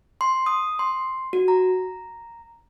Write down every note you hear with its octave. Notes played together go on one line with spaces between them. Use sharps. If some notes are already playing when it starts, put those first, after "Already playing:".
C6
D#6
C6
F#4
A#5